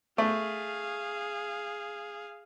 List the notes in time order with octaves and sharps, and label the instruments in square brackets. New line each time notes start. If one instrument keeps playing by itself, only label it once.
[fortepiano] A3 [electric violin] G#4 F5